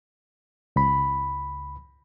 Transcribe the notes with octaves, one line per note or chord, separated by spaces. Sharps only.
C#2 B5